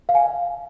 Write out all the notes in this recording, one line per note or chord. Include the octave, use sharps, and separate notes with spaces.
F5
G#5